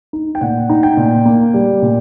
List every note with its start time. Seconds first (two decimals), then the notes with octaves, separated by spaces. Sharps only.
0.13 D#4
0.35 G5
0.41 A#2 F#5
0.69 D#4
0.83 G5
0.97 A#2
1.26 A#3
1.54 G3
1.82 A#2